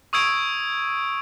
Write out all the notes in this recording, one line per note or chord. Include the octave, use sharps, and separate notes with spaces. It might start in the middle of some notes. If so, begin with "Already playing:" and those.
C#6 D#6 E6 G#6 D7